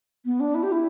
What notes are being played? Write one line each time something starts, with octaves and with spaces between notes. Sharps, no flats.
B3
D4
E4
G4
E4